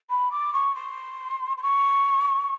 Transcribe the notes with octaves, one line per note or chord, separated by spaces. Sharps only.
B5
D6
C#6
C6
C6
C#6